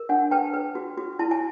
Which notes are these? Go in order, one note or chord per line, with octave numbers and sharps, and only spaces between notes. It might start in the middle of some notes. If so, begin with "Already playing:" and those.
Already playing: A#4
D4 F#5 G#5
B4 G5 A5
B4
F#4
F#4
E4 A5
G#5